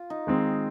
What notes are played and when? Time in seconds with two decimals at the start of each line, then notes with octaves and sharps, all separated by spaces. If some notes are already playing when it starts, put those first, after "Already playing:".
Already playing: F4
0.10 D#4
0.27 D#3 G#3 C4